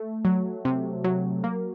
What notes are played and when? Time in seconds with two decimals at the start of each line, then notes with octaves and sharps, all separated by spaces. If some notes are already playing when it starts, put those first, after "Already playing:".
Already playing: A3
0.25 F#3
0.65 C3
1.04 F#3
1.44 A#3